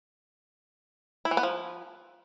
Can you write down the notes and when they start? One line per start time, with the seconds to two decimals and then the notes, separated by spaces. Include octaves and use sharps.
1.25 E4
1.31 E3
1.37 B3
1.43 F3